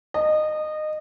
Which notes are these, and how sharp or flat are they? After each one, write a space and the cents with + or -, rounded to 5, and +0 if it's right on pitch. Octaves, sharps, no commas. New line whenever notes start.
D#5 -20